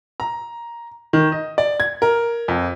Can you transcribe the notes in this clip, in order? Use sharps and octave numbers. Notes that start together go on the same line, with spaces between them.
A#5
D#3
D#5
D5
G#6
A#4
F2